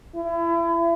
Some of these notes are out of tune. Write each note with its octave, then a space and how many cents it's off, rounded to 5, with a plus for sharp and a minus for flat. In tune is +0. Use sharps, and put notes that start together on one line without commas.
E4 +35